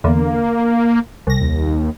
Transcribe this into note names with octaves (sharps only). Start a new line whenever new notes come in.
E2 D3 A#3
C2 A#6
D#2